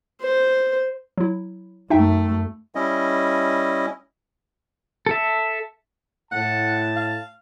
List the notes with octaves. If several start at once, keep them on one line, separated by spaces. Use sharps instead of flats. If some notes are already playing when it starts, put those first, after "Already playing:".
C5
F#3 E4
F#2 A3 D#4 E5 G5
G3 C#4 E4 D#5
A4 E5
A2 F#5 A5
F5